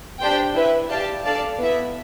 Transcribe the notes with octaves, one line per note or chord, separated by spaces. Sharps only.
D4 G4 C5 G5
E4 B4 E5
G4 D5 F5 A5
D4 A4 D5 F5 A5
B3 E4 B4 E5